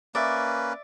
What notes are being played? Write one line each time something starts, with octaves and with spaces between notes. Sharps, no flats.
A#3 C#4 B4 D5 E5